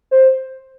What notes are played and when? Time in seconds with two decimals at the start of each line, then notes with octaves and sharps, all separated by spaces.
0.11 C5